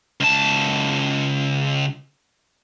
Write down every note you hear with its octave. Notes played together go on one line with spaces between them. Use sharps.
C#2 A5